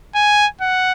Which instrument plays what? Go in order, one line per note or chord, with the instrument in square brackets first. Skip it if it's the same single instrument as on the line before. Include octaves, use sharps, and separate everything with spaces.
[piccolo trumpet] G#5
F#5